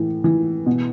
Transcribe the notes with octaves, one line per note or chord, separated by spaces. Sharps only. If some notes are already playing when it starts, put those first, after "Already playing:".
Already playing: A2 E3
E3
B2